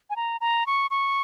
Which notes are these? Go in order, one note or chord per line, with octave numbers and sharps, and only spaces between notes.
G#5
A#5
A#5
C#6
C#6